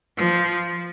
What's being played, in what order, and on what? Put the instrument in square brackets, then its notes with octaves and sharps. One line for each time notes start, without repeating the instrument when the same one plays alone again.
[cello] F3